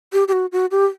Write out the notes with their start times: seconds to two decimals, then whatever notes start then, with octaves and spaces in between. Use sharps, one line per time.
0.13 G4
0.28 G4
0.33 F#4
0.52 F#4
0.71 G4